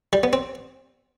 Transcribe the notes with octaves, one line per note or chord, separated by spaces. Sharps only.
G3
B3
C4